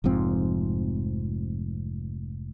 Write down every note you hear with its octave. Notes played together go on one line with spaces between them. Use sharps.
F1 G#2 F3 C4